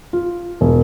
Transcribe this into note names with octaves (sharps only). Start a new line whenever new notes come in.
F4
E1